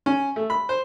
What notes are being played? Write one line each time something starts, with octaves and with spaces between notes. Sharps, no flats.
C#4
A3
B5
C5